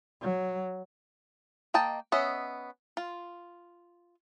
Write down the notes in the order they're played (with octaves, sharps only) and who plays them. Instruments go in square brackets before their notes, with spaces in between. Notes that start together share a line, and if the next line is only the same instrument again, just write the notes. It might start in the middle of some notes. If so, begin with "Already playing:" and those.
[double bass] F#3
[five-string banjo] A#3 D#5 G5 A5
B3 C#4 D#5 E5
F4